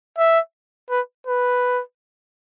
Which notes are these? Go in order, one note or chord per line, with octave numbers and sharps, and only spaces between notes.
E5
B4
B4